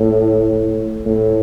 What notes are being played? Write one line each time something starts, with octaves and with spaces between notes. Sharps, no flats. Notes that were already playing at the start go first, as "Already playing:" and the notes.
Already playing: A2
A2